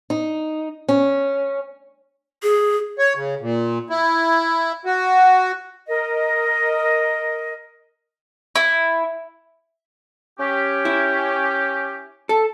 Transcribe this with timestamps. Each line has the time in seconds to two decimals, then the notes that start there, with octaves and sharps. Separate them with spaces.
0.10 D#4
0.88 C#4
2.43 G#4
2.99 C#5
3.16 C#3
3.41 A#2
3.90 E4
4.85 F#4
5.87 A#4 D#5
8.56 E4
10.39 C#4 G4
10.85 E4
12.29 A4